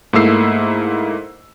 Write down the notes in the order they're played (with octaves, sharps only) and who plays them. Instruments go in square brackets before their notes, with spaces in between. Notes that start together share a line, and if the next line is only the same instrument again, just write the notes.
[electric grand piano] G#2 A3 A#3 E4 E6 C7